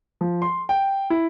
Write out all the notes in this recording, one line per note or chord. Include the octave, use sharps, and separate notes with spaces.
F3
C6
G5
E4